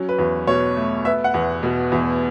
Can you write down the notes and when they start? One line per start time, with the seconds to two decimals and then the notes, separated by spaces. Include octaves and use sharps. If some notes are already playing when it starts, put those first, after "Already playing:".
Already playing: F#3 C#4
0.09 B4
0.19 E2
0.47 B2 C#5
0.76 A3
1.05 B3 E5
1.24 F#5
1.34 E2
1.63 B2
1.92 E2